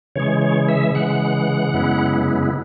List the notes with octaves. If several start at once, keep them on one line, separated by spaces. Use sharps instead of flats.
C#3 E3 G#3 C#5
C#5
E5
C#3 E3 G#3 F#5
F#2 C#3 G#3 B3 E4